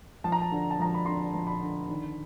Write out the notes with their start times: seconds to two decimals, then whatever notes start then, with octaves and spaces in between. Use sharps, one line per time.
0.24 F3 A5
0.32 A#5
0.41 A5
0.51 D3
0.71 A5
0.79 F3 A#5
0.94 B5
1.06 D3 C6
1.34 F3
1.47 B5
1.62 D3
1.89 D#3